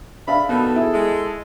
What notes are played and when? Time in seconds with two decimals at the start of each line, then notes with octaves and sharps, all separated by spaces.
0.28 D4 E5 F5 B5
0.49 D#3 B3 D#4 F#4 A4
0.76 E4 G#4
0.93 G#3